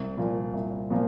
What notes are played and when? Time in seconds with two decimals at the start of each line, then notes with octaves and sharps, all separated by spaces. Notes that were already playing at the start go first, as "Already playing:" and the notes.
Already playing: C2
0.17 A#2 F3 A#3 F4
0.54 C2
0.90 A#2 F3 A#3 F4